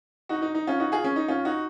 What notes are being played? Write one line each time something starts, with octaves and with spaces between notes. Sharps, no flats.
D#4 F#4
D#4
D#4
C#4 F4
D#4 F#4
F4 G#4
C#4
D#4
C#4 F4
D#4 F#4